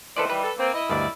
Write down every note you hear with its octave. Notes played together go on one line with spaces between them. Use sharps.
D#3 E3 A4 B4 C5 D5
G3 B4
A4
A#3 C4
E4 D#5
D2 G2 D#3 D5